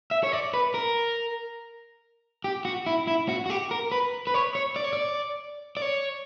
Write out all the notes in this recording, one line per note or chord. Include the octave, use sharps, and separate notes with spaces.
E5
C#5
D5
B4
A#4
G4
F#4
E4
E4
F#4
F#4
G4
A#4
B4
B4
C#5
C#5
D5
C#5
D5
D5
C#5